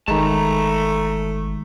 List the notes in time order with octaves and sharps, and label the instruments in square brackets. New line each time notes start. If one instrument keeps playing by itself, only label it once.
[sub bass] G1 [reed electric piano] D#3 G#3 [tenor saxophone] A3 [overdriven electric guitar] A5 A#5